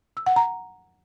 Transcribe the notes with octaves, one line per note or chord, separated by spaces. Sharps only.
E6
F#5
A#5